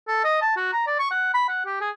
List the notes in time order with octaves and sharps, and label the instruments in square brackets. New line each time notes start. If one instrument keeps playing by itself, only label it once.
[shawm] A4
D#5
A5
F#4
A#5
D5
C#6
F#5
B5
F#5
G4
G#4